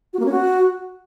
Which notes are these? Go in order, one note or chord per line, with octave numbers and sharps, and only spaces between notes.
F#4
A#3
C#4
F#4